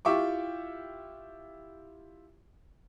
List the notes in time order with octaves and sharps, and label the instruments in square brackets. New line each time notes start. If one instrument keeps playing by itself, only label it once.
[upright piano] E4 F4 G4 E5 C#6 D6